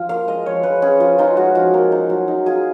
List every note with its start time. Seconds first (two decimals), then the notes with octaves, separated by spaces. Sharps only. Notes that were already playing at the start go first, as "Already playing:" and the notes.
Already playing: F3 F4
0.09 A#3 F5
0.28 G#3 D#5
0.46 F3 C#5
0.63 G#3 B4
0.82 C#4 G#4
1.00 F3 F4
1.18 D#4 F4
1.37 G#3 F#4
1.55 F3 F4
1.74 A#3
1.92 D#4
2.10 F#3
2.28 D#4
2.46 F4 G#4